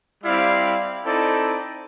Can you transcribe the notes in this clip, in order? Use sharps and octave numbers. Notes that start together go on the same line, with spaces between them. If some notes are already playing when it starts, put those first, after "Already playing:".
G3 C4 E4 D5 F5
C4 D#4 E4 A4 D5